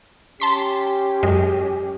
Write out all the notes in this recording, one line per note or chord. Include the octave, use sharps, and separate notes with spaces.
C#4 G4 A5 C6 B6
F#2 G#3